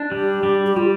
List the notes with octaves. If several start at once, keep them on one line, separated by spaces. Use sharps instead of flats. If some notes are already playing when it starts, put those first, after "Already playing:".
Already playing: D4
G3 G4
G3
G4
G3 F4